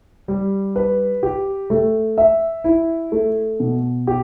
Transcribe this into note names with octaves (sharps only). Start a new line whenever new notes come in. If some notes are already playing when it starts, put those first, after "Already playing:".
G3
B4
G4
A3
E5
E4
A3
B2
G4